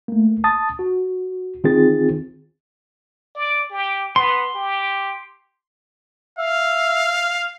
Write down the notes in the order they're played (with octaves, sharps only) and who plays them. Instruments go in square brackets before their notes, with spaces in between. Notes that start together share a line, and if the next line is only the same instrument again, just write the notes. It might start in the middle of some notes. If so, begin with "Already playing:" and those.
[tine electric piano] A3 A#3
A5 D#6 A6
F#4
D#3 C4 D#4 F4 G#4 A6
[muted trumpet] D5
G4
[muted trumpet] B3 [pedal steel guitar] C6
[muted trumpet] G4
[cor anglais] E5 [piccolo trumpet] F5